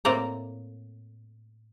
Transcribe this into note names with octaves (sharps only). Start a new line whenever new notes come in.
A2 A#3 C4 D5 A#5